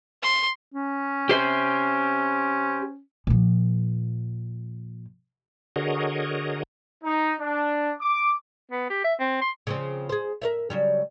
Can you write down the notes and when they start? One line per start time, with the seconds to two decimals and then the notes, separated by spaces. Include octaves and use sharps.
0.23 C6
0.74 C#4
1.29 G4 C5
3.27 A#2 F3
5.76 D3 F#4 G#4 A#4 C#5 D#5
7.04 D#4
7.40 D4
8.01 D6
8.72 B3
8.90 G4
9.04 E5
9.20 C4
9.42 C6
9.67 C#3 F3 C4
10.09 G#4 C5
10.42 A#4 C#5 E5
10.70 C#3 F#3 G3